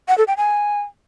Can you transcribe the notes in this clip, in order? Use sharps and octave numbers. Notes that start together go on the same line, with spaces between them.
F#5
A4
G5
G#5